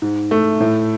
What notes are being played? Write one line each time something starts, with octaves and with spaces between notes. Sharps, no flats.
G#2
A3
A2